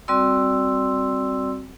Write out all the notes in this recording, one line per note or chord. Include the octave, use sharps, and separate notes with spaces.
G3 C4 F#4 D5 C6 E6